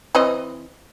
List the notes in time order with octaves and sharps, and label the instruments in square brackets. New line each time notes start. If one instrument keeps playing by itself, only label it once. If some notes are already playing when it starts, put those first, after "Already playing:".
[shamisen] E3 C4 D#5